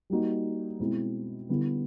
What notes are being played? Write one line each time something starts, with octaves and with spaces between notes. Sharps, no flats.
G3 A#3 D#4 F#4
B2 G#3 C4 E4
D3 G3 B3 E4